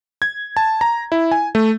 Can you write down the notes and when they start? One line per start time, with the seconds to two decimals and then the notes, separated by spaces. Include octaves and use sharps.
0.22 G#6
0.57 A5
0.81 A#5
1.12 E4
1.31 G#5
1.55 A3